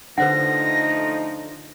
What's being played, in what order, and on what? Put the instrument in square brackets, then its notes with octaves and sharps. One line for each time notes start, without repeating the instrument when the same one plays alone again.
[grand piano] D3 [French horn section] F3 A3 D#4 [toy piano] B4 C5 F#5 [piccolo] A#6